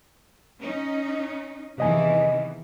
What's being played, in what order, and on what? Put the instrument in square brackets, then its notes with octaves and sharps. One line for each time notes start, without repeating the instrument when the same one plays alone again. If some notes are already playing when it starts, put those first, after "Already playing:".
[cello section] C#4 D#4
[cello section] E2 D#3 E3 [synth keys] C3 D#5 G#5